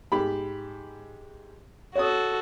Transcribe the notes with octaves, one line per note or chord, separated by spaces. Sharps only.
G#2 G4 B5
F#4 A4 C#5 D#6